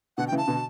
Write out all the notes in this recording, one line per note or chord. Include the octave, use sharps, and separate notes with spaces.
B2 D3 F#5
G5
C#3 E3
A5
B2 D3